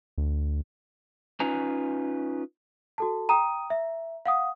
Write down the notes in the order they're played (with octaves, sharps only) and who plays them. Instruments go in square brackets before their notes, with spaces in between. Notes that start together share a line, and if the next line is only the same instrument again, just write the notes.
[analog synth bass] D2
[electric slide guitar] C#4 D#4 F4 B4 G#5 A#5
[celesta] F#4 A4 A5
[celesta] G5 D#6 D#7 [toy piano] A#5
[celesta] E5
F5 F#5 D#6